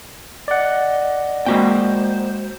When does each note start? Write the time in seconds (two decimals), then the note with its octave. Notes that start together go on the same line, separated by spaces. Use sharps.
0.48 D5 D#5 F#5
1.46 G#3 A#3 F#4 C5 G5